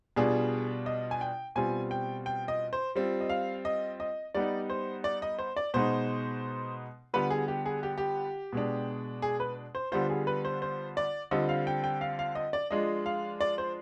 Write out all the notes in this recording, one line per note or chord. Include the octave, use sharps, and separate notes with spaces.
B2 G3 D4 F4 G#4
D#5
G#5
G5
B2 G3 C4 F4 G#5
G5
G5
D#5
C5
G3 C4 F4
D#5
F5
D#5
D#5
G3 B3 D#4 D5
C5
D5
D#5
C5
D5
B2 G#3 B3 D#4 C5
D3 G3 B3 F4 B4
G#4
G4
G#4
G4
G4
B2 G#3 D4
G#4
B4
C5
D3 G3 B3 F4 C5
G#4
B4
C5
C5
D5
D3 G3 C4 F4 D#5
F5
G5
G5
F5
F5
D#5
D5
F3 G#3 D4 F4 D#5
F5
D5
C5